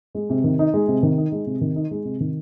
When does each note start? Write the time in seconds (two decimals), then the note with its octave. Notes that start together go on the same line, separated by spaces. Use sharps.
0.15 G#3
0.30 C3
0.44 D#3
0.59 D#4
0.74 G#3
0.88 C3
1.03 D#3
1.17 D#4
1.32 G#3
1.46 C3
1.61 D#3
1.76 D#4
1.91 G#3
2.05 C3
2.20 D#3